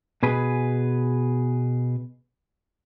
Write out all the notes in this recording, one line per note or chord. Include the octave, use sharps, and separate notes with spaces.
B2 G#4 B4 G#5